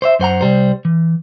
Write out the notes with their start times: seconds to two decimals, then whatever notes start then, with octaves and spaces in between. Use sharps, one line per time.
0.02 C5 C#5 E5
0.20 F#2 C5 F#5 A#5
0.41 C2 G3 C5
0.85 E3